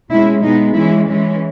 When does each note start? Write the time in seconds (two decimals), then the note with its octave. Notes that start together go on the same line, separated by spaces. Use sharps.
0.10 B2 G#3 C#4 E4
0.43 B2 G#3 B3 D#4
0.75 E3 G#3 C#4 E4
1.08 E3 G#3 C#4